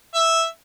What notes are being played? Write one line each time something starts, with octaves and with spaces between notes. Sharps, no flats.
E5